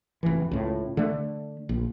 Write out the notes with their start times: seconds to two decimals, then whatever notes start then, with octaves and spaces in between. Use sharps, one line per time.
0.23 F1 E3
0.51 C#2 A2
0.97 D3 A3
1.69 A#1